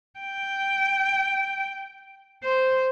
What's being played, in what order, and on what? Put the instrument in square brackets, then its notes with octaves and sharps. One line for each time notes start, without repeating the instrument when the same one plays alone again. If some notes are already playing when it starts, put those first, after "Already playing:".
[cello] G5
C5